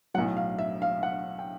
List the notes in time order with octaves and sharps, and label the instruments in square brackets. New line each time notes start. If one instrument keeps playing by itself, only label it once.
[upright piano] F#3 F#5
B1 A2
F5
E5
F5
F#5
G5